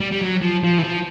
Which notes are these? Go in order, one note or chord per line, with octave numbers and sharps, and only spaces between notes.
G3
G3
F#3
F3
F3
E3
F3